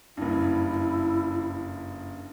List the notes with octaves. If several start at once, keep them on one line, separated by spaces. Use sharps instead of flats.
F#1 G2 E4